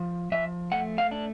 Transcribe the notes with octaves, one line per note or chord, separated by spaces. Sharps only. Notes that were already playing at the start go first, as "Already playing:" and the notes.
Already playing: F3
F3 E5
A3 F#5
F5
D4